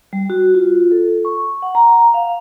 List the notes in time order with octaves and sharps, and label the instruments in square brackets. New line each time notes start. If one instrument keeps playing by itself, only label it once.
[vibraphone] G3
F#4
F4
A4
C#6
F#5
A#5
F5